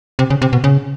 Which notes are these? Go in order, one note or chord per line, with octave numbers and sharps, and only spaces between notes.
C3
C#3
C3
B2
C#3